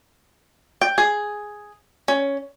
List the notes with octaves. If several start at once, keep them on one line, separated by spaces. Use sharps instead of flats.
G5
G#4
C#4